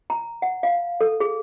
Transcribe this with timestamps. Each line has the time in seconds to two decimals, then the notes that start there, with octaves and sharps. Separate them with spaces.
0.10 A#5
0.42 F#5
0.63 F5
1.01 A4
1.20 G#4